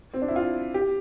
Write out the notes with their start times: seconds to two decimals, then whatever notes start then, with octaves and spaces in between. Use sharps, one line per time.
0.14 C4
0.22 D4
0.28 E4
0.36 F4
0.74 G4